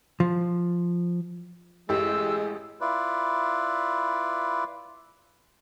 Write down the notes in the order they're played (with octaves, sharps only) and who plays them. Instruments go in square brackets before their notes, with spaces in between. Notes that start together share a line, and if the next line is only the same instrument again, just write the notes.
[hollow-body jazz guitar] F3
[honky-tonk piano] A1 G4 [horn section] G#3 [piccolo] E6
[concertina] E4 F4 B4 D5